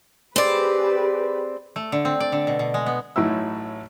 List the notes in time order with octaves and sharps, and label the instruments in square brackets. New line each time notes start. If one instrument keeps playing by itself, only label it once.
[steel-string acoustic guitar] C4 D5 [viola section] G4 G#4 B4
[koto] A3
D3
C4
D5
D3
B2
B2
G#3
B3
[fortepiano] A1 A2 F#3 D#4 E4 E6